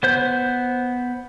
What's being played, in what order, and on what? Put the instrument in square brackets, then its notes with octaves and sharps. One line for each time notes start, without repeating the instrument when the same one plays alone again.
[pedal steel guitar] B3 C5 G6